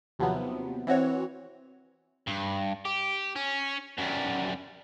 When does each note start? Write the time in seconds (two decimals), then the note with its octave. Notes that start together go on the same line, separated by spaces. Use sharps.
0.19 D#2 C3 F3 F#3 B3
0.87 E3 C4 F#4 C#5
2.27 G2
2.85 G4
3.36 C#4
3.98 F#2 G3